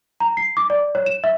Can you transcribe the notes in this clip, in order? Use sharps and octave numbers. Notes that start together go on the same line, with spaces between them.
A#5
C7
D6
D5
C#5
E7
E5